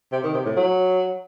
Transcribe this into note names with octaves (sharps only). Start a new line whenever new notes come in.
C3
D#3
C3
A2
F#3